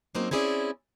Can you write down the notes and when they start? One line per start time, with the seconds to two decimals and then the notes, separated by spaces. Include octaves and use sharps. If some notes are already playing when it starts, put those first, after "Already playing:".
0.15 F#3 A#3 C4 C#4 D#4
0.31 C4 C#4 E4 G#4 C#5 D5